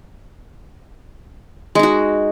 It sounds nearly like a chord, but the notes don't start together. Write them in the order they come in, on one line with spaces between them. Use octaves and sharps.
G#3 D#4 F#4